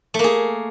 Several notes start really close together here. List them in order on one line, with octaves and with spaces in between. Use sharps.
A3 A#3 G#4